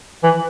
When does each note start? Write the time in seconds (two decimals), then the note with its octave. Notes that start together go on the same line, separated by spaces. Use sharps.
0.23 E3